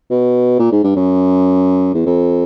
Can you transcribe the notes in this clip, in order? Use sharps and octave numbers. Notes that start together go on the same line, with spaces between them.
B2
A#2
G#2
G2
F#2
E2
F2